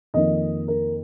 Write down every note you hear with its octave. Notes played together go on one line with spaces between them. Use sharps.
F2 D#3 A#3 D#5
A#4